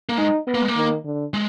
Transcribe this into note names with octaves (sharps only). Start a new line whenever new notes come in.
A#3
G#3 D#4
B3
A#3
G#3
A#3
D#3
D3
G#3